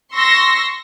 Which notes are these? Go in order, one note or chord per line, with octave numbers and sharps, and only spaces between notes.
C6 C#6 E6 A#6